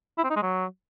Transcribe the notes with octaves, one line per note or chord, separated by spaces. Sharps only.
E4
C4
D#4
G#3
F#3